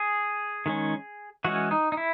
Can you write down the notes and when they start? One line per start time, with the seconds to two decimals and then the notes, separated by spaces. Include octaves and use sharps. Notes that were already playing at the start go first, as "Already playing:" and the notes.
Already playing: G#4
0.66 D#3 G#3 C#4
1.44 E3 G#3 C#4 F#4
1.71 D#4
1.92 D#4
1.97 E4